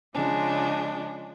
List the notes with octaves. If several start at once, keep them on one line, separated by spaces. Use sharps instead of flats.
C#3 F3 G#3 D4